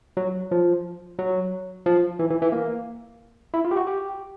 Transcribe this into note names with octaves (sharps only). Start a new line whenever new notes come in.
F#3
F3
F#3
F3
E3
E3
E3
A#3
E4
F4
G4
F#4
G4